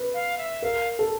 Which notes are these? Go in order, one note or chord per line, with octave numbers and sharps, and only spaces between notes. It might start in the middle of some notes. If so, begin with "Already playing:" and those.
Already playing: B4
F5
E5
A#4 F5
A4